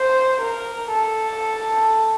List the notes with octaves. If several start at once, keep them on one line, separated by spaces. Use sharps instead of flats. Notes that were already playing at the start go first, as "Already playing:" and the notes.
Already playing: C5
A#4
A4